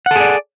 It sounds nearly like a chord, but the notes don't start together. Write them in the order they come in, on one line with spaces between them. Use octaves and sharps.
F#5 A4 G#4 D5